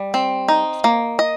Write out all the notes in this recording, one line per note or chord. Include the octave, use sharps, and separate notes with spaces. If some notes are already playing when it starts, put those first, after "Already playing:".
Already playing: G3
C4
D#4
A#3
D#5